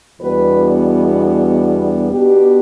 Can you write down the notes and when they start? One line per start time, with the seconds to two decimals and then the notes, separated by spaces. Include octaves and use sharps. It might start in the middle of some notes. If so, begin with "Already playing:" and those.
0.20 E2 B2 G3 B3 D4 B4
2.11 B2 B3 D4 G4